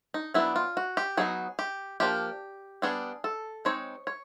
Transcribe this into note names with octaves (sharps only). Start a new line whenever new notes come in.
D#4
F#3 B3 D4 E4
F4
F#4
G4
F#3 B3 D#4 G#4
G4
F3 A#3 D4 G4
G3 B3 D4 G#4
A4
G#3 C4 D#4 C#5
C#5